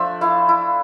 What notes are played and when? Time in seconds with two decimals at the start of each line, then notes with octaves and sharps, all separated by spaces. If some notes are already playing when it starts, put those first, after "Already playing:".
Already playing: F3 A3 D4 E5
0.21 E4 F5
0.49 E4